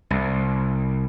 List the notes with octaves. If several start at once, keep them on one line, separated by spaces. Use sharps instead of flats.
C2